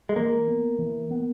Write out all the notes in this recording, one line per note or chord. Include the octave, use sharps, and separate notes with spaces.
G#3
E3 A#3
B3
E3
B3